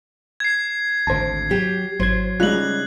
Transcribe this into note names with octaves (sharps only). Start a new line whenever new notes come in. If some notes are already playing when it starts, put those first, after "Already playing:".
G#6 C7
G#1 D2 C5 A5
F#3 G4
G#1 F#3 C5 G#6
C#3 G3 G#3 D#4 F4 F#6 F#7